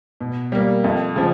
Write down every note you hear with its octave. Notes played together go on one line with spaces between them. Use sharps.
B2
G3 A#3
F2
C#3 F3